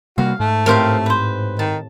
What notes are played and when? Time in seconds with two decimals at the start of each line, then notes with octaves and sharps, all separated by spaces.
0.18 C3 G3 A#3 F#4 F5
0.40 G#2 A3
0.66 A2 C4 G4 A#4 C5 F5
1.06 B4 C5
1.59 D#3 A5